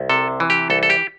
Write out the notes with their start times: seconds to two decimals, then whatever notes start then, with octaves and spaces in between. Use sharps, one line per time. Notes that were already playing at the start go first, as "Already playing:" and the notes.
Already playing: C2
0.10 C3 A4
0.40 E3
0.50 G4
0.70 C2 A4
0.83 A4
0.90 G4